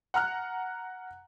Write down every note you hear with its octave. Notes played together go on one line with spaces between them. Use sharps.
F#5 A#5 F6 F#6